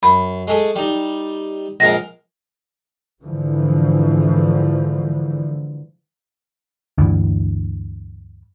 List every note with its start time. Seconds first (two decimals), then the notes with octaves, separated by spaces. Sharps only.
0.03 F#2 B5
0.47 G#3 A3 G#4
0.76 G3 D#4
1.80 A#1 G#3 A#4 A#6
3.24 G#2 D3 E3 F3
6.98 D2 G2 E3